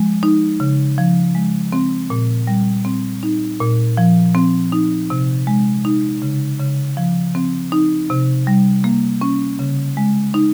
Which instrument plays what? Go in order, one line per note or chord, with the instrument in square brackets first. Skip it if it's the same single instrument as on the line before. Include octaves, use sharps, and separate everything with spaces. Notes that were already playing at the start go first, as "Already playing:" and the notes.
Already playing: [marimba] F3 G#3
D#4
C#3
F3
G#3
C4
A#2
G3
C4
D#4
A#2
F3
C4
D#4
C3
G#3
D#4
C#3
C#3
F3
C4
D#4
C3
G3
A#3
C#4
C#3
G#3
D#4